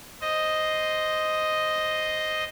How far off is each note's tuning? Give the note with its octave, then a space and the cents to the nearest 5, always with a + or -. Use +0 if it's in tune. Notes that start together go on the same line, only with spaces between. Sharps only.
C5 +0 D#5 +0